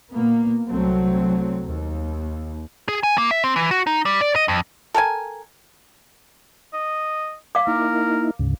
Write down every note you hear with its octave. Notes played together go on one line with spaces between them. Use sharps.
A#2 A#3 B3
C2 F#3 A3 C4
D#2
G#4
G#5
A#3
E5
C4
E3
F#4
D#4
G3
D5
D#5
F2
A4 A#4 G5 G#5
D#5
F5 D6
A#3 D#4 E4 A#4
D2 G#2 C#3